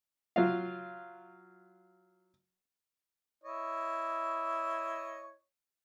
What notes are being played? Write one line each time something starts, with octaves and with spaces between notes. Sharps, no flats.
F#3 F4 F5
E4 C#5 D#5